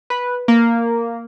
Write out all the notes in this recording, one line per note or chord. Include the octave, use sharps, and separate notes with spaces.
B4
A#3